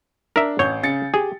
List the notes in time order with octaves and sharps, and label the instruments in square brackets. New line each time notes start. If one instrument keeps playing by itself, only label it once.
[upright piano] D4 [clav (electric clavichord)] A#4 E5
[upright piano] A1 G6 [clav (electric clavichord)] C#5
[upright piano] C#3 A6 C#7
[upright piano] G4 [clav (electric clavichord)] G#4